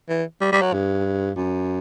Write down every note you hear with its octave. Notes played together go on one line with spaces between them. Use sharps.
E3
G3
G3
F#3
G2
F#2